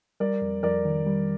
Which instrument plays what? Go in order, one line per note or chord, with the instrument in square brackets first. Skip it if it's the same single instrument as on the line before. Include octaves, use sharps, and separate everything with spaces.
[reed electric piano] G3 [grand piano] A#4 D5
[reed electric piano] F2
[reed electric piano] F2 [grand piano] A#4 D5
[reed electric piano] D#3
G3